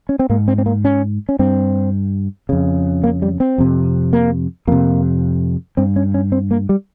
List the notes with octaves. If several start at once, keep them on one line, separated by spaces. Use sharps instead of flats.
C#4
C4
G#2 A#3
C4
C4
A#3
C#4
C#4
G2 C4
F2 C#3
A#3
G3
C4
F2 C3
A#3
F2 C3 A#3
G2 C4
C#4
C#4
C4
A#3
G3